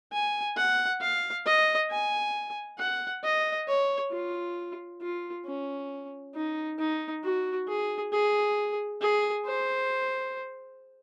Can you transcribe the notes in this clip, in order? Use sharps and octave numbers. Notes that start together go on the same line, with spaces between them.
G#5
F#5
F5
D#5
G#5
F#5
D#5
C#5
F4
F4
C#4
D#4
D#4
F#4
G#4
G#4
G#4
C5